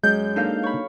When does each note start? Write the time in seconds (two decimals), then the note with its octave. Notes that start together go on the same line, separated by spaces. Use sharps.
0.03 F#2 G#3 G6
0.36 A#3 D4 D#4 A4 F5
0.63 C#5 B5